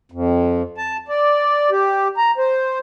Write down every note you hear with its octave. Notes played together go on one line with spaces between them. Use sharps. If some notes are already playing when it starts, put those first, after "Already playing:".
F2
A5
D5
G4
A#5
C5